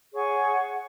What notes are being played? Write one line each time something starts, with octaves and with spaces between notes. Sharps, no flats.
G#4 C#5 F#5 C#6